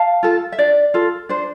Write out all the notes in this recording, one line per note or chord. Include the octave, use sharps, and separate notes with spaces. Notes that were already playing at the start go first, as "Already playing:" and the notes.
Already playing: F5 A5
F4 A4
E5
D4 D5
F4 A4
D4 C5